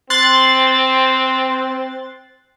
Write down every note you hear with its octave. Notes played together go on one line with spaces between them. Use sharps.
C4 C6 F#6 A6